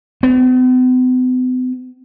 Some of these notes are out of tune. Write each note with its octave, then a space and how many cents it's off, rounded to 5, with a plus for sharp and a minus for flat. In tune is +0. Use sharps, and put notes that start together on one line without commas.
B3 +45